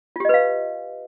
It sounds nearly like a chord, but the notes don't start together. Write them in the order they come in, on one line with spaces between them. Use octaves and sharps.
F4 G4 D#5 B4 F5